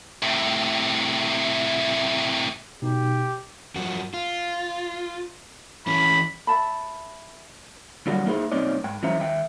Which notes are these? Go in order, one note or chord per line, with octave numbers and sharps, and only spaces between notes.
A2 C3
B2 D#4 G4
F#2 F3 F#4
F4
E3 C#4 B5
E5 F#5 A5 B5
D3 F#3 G3 A#3 F#4
A#3 D#4 E4 G#4 C5
B1 A#3 C4 C#4 D#4 D5
G#2 G5
E3 F#3 C#4 C5 E5 A#5
D#2 E5 G5